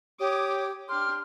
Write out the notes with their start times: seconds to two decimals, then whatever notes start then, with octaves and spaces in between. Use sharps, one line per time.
0.20 G4 C#5 D6 D#6
0.89 D4 G4 C6 F6